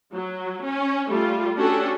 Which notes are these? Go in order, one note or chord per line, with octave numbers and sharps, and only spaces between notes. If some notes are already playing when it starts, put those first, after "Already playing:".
F#3
C#4
G3 A3 F4
A3 C#4 D4 F#4 G4 A4